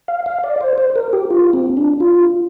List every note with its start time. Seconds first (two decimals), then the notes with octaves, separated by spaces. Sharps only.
0.08 F5
0.26 F5
0.44 D5
0.61 C5
0.78 C5
0.96 A#4
1.13 G4
1.31 F4
1.53 C4
1.77 D4
2.00 F4